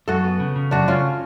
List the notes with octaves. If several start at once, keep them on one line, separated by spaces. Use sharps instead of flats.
F#2 F#4 A4
B3
C#3
C#3
F#2 D4 F#4
C#3 C#4 F4